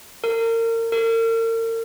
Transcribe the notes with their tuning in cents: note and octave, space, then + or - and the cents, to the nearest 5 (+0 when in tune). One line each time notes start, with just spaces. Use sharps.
A#4 -30
A#4 -40